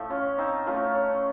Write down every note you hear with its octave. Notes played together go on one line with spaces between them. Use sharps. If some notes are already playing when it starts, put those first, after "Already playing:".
Already playing: A2 F3 A3
C#4 F4
C4 D#4
A2 F3 A3 C#4 F4
C#4